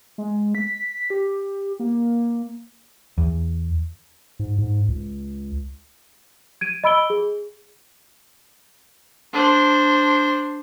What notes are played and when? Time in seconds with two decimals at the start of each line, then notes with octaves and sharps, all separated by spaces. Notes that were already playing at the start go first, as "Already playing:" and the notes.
0.18 G#3
0.55 B6
1.10 G4
1.80 A#3
3.18 E2
4.39 G#2
4.58 G#2
4.88 C#2
6.61 G#6 D7 D#7
6.84 D#5 B5 E6 D7 G7
7.10 G#4
9.33 D4 C5